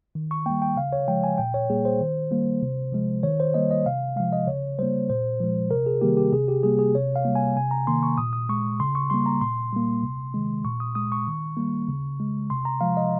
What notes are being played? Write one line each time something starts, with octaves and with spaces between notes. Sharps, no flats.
D#3
C#6
G3 A#3 G5
G5
C#3 F5
C#5
F3 G#3 G5
G#5
A#2 G5
C#5
G3 A#3 G#4
C5
D#3
G3 A#3
C3
F3 G#3
D#3 C#5
C5
G3 A#3 D#5
D#5
C3 F5
F3 G#3 F5
D#5
C#3 C#5
G3 A#3 C5
A#2 C5
F3 G#3
C3 A#4
G#4
D#3 G3 A#3 G4
G4
C3 G#4
G4
G3 A#3 G#4
G#4
C3 C#5
F5
G3 A#3
G#5
C3 G#5
A#5
D#3 A#3 C6
C#6
A#2 D#6
D#6
G#3 C#6
C#3 C6
C#6
G3 A#3 C6
A#5
A#2 C6
G3 A#3
C3
D#3 G#3
A#2 C#6
D#6
G#3 D#6
C#6
D#3
G3 A#3
C#3
G#3
C3 C6
A#5
F3 G#3 F5
D#5